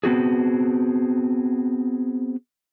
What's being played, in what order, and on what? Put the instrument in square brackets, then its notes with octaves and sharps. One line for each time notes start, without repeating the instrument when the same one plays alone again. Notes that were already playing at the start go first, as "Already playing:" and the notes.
[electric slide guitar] B3 C4 F#4 G#4